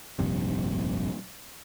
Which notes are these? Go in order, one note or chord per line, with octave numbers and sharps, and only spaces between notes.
F1 A#1 G2 C3